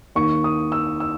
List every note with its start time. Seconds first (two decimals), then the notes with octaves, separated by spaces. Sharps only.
0.15 D#2 D#3 C#6
0.44 D#6
0.72 E6
1.00 E6